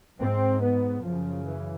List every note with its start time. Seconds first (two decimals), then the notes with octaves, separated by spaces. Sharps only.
0.20 G#2 C4
0.63 B3
1.04 F#2 C#3 F3
1.46 E3